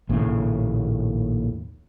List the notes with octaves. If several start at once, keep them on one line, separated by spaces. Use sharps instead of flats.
A#1 D#2 A2 C#3